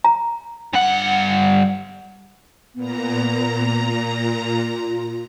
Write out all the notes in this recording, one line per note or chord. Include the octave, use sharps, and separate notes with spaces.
A#5
G2 F#5
A#2 B3 A#5
F4